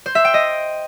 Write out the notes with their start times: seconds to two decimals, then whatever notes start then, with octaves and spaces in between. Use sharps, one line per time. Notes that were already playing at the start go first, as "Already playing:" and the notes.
0.06 C5
0.15 E5
0.25 G5
0.34 D#5